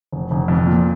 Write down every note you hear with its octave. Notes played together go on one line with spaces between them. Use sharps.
F1
F1
F2
A#2